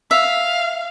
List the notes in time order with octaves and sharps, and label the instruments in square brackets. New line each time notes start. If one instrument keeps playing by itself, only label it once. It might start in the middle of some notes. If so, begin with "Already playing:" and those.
[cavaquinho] E5 [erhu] F5